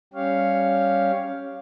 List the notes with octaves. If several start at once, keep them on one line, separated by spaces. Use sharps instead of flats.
G3 C#4 G4 C#5 F5